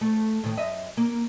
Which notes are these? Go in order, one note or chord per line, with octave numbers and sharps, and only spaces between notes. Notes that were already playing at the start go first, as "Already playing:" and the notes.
A3
A2 D#3
F#2 D#5 E5
A#3